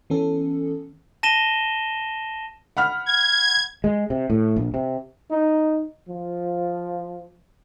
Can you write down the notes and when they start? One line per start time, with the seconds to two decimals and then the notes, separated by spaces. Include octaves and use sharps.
0.10 E3 B3 C#4 A4
1.23 A5 A#6 D#7 E7 G7
2.77 F#5 B5 F6
3.06 G#6
3.84 G#3
4.10 C3
4.30 A2
4.56 A#1
4.74 C3
5.31 D#4
6.09 F3